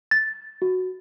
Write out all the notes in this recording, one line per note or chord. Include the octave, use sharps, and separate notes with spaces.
A6
F#4